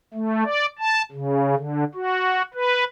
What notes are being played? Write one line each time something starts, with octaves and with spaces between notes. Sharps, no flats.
A3
D5
A5
C#3
D3
F#4
B4